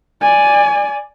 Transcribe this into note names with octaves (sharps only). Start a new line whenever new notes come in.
D5 G#5